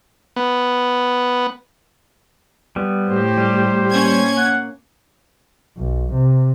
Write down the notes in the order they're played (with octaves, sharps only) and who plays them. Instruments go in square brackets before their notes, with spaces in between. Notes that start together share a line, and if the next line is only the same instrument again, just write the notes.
[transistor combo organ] B3
[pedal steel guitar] G3 B3
[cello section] A2 A3 G4 [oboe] C5
[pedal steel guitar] G3
[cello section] A#3 [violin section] C#4 G#6
[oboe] F#5
[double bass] B1
C3